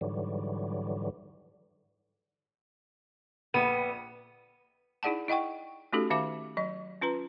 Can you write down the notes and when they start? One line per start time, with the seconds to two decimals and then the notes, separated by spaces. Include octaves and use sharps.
0.01 G#2 D3 E3 F#3 G3
3.54 A#1 B3 B5 D#7
5.03 D#4 E4 G#4 D5 F#5 A5
5.28 E4 D#5 F#5 G5 C#6
5.93 A3 C#4 D#4 F#4 G4 A4
6.10 D#3 E5 F5 A5 D6
6.57 F#3 D#5
7.01 C#4 F4 B4 A#5